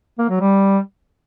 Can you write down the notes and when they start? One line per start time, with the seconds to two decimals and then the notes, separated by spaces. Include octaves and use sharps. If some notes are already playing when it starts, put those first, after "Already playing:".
0.18 A#3
0.29 F#3
0.40 G3